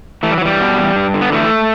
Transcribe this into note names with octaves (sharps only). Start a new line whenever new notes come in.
E3 A3
G3
F#3
E3 G3
B2
E2
G2
D3
B3
E3 A3